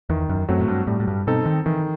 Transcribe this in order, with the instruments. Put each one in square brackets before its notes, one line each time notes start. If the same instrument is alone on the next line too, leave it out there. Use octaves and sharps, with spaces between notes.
[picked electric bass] E2 [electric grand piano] D#3
[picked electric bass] F#2
[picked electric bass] F#2 [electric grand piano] F#3 A3 C4 F#4
[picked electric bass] A2
G2
[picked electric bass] A2 [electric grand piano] G3
[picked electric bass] A2
G2
[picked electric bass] B2 [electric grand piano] C4 D#4 A4
[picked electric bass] D#3
[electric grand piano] D#3 [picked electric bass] E3